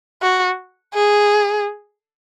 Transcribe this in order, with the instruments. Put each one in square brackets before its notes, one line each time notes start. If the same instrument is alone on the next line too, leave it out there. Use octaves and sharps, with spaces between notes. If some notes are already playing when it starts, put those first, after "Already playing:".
[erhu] F#4
G#4